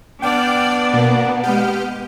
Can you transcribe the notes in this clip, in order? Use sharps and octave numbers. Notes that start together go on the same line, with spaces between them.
B3 D4 D5 G5 D6 F6
B2 A#3
G#3 G4 F6 G6